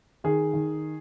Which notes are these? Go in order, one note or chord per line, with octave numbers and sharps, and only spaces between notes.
D#3 G#4
D#3